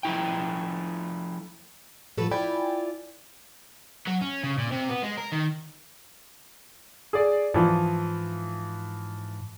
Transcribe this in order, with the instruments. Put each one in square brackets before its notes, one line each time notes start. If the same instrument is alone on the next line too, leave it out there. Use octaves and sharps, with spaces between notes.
[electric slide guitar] F3 A3 E4 G5
[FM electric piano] A2 F3 [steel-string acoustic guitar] F#3 A4 B4
[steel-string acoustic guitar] E4 F4 D5 [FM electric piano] G5 G#5 B5
[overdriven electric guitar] F#3
C#4
C#3
A#2
C3
B3
G#3
A#4
D#3
[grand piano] G#4 D5
[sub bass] G#2 [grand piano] E3 F3